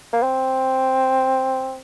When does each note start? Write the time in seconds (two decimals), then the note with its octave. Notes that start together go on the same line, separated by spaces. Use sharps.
0.13 A#3
0.23 C4